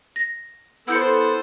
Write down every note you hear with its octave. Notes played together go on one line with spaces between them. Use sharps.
A#6
B3 E4 A4 C5 E6 G6 C#7